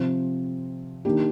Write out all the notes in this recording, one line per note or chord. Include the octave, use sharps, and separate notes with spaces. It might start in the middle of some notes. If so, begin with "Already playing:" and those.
Already playing: C3 F3 C4
D#3 A#3 D4 G4